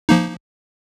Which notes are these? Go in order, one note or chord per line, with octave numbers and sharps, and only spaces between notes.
F3 A#3 D#4